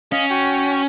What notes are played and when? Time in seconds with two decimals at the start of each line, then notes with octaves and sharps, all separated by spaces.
0.12 C#4 D#5 F5
0.30 F#4 G5